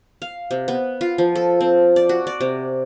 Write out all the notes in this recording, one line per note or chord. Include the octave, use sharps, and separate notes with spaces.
F5
C3
B3
F4
F3
A4
C4
D5
F#4
D5
C3